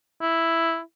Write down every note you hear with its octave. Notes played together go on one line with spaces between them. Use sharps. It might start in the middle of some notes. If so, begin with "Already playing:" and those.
E4